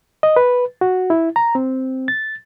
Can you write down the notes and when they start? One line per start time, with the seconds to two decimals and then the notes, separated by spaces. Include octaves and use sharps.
0.23 D#5
0.36 B4
0.81 F#4
1.10 E4
1.36 A#5
1.55 C4
2.08 A6